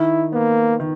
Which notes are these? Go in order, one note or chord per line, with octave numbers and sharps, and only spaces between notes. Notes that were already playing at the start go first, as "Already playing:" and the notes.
Already playing: D#3 E4
A#3 B3
D#3